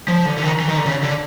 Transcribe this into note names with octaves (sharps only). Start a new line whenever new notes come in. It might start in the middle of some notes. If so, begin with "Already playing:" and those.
F3
D3
D3
D#3
E3
D#3
D3
C#3
D3